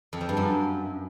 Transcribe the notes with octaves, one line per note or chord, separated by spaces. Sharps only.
F2
F3
G2
F#2